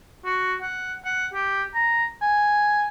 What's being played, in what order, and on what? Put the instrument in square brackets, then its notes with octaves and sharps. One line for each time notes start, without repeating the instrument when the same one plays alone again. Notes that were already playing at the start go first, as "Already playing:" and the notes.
[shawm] F#4
F#5
F#5
G4
A#5
G#5